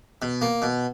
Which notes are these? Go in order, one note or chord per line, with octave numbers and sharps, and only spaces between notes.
B2
A#3
B2